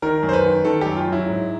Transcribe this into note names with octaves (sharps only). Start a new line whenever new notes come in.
D#3 A#4
F#2
C5
B4
D#3
D#3 A4
F#2 G4
F4
F#3 E4
G#2